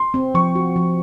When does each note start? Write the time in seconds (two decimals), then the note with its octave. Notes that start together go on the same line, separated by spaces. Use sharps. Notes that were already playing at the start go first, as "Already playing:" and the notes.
Already playing: C6
0.14 C4
0.34 F3 C#6
0.55 F#4
0.76 F3